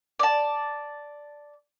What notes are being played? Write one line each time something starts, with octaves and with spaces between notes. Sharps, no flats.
D5 A5